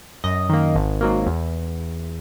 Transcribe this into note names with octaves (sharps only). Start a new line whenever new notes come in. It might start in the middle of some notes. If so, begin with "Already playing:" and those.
F#2 D#5
D#3 A#3
G#1
G#2 F#3 A#3
E2